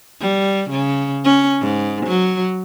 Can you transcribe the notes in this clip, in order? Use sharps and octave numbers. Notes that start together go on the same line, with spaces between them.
G3
C#3
C#4
G#2
F#3